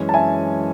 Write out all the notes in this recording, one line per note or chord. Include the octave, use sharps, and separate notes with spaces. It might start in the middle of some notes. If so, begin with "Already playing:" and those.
Already playing: F#2 E3 G#3 C#4
A5
E5 G#5